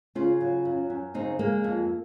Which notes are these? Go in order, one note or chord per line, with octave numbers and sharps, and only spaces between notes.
C#3 C#4 F4
F#3
F#2
F#2
C#3 C4 D#4
G#3 A#3
F2